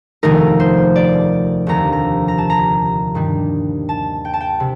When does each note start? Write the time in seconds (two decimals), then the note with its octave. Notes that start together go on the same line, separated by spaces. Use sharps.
0.23 F1 D#2 D#3 A3 D#4 A#4
0.60 C5
0.96 D5
1.67 F1 D#2 D3 A#5
1.93 A#5
2.28 A#5
2.38 A5
2.50 A#5
3.15 G2 D#3 G3
3.89 A5
4.25 G5
4.34 A5
4.41 G5
4.60 C3